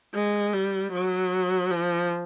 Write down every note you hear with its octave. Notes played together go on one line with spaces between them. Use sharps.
G#3
G3
F#3
F3